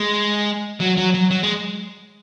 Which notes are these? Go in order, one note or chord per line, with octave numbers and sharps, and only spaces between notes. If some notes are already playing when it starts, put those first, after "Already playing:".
Already playing: G#3
F#3
F#3
F#3
F#3
G#3